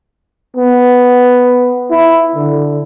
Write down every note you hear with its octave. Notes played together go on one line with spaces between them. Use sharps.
B3
E4
D3